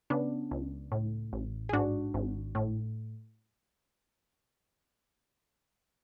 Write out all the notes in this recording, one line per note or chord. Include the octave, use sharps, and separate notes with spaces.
C#3 B3 D4
C#2
A2
A1
G#4
G#2 D4 F#4
G#1
A2